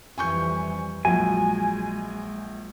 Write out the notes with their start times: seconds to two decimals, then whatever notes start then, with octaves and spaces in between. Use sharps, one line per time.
0.18 F2 E3 G3 G#5 C#6 G6
1.05 A#1 F#3 G#3 G#5